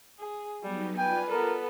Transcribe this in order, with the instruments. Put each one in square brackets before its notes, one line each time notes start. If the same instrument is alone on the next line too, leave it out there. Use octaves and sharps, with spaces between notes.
[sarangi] G#4
[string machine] F#3 B3 D#4 [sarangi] G3
[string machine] F4 D5 [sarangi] B4 [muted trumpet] G5 [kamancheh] G#5
[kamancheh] B3 A4 [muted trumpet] A#4